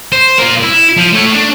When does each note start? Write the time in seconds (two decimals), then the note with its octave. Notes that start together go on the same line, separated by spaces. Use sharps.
0.12 C5
0.38 A#3 F4
0.63 E4
0.97 F3
1.12 A3 C#5
1.34 D4